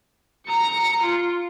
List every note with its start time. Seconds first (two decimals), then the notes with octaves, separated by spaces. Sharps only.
0.47 A#5 C#7
1.02 F4